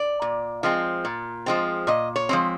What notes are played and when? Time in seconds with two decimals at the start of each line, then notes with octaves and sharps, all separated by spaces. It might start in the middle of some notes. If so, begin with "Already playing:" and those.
Already playing: D5
0.22 A#2
0.63 F3 G#3 C4
1.05 A#2
1.46 F3 G#3 C4
1.87 A#2 D#5
2.16 C#5
2.29 F3 G#3 C4